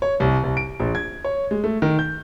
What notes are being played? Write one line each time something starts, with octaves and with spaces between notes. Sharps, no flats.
C#5
C2
C2
D7
A#1
G#6
C#5
G#3
A3
D#3
G6